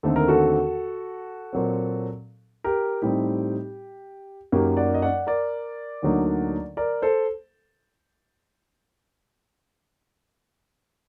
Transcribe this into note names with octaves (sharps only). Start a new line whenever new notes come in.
D#2 D3 A3 C4 D#4 A4
A#4
F#4 A4
A#2 F#3 C4
G4 A#4
A2 G3 C4 D#4 G4
F#2 F#3 A#3 D#4 G4
D5 F#5
D#5
D5 F#5
A#4 D5
D2 D3 F#3 A#3 D#4
A#4 D5
A4 C5